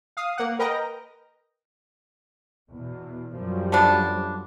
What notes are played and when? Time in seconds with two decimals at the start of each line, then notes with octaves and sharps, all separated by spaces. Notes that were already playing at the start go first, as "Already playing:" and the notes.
0.17 F5 D#6
0.38 A#3 F#5
0.59 A#4 B4 D#5 G5 A#5 A#6
2.69 E2 B2
3.35 F#2 F3 G3
3.72 A3 B3 D4